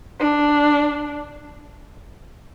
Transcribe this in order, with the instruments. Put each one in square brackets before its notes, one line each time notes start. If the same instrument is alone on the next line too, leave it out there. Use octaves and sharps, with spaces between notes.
[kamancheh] D4